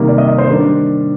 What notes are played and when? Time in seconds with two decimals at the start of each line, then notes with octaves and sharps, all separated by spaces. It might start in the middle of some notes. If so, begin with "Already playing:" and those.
Already playing: C3 D#3 G3 A#3
0.08 D5
0.18 D#5
0.28 D#5
0.38 C5
0.49 D#3 G3 D4 A#4